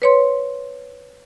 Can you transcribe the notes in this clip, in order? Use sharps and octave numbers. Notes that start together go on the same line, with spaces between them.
B4 C#5 C6